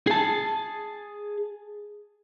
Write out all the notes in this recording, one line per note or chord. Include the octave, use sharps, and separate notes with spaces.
G#4 A5